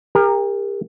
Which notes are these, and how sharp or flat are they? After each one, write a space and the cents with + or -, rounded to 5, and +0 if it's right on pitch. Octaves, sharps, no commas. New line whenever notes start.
G4 +40 A#4 +0